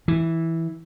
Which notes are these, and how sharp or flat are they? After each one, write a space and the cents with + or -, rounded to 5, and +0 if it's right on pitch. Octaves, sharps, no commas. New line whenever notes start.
E3 -5